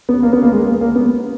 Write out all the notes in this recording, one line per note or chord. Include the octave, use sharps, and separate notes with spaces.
B3
A#3
B3
A#3
G#3
A#3
A#3
B3